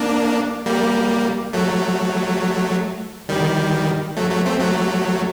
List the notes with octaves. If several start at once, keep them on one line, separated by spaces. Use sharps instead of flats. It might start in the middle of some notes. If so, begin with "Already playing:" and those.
Already playing: A#3 D4
G3 A#3
F#3 A3
D#3 G3
F#3 A3
F#3 A3
A3 C4
F#3 A3